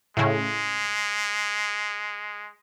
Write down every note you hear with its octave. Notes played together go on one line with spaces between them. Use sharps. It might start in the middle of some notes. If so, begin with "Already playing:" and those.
A2 C#3 G#3